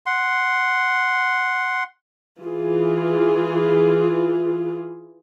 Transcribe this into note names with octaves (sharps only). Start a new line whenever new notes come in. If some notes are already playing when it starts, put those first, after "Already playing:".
F#5 C6
E3 F4 G#4